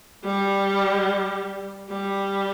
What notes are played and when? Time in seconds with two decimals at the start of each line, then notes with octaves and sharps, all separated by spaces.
0.25 G3
1.89 G3